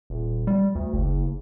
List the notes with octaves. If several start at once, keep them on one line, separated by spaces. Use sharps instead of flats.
D#1
G3
D2
F#1